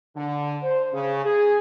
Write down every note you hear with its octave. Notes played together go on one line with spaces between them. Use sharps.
D3
C5
C#3
G#4